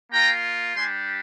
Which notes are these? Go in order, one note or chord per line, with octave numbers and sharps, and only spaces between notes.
A#3 F4 G5 A#5
G3 D4 G4 G#5 C6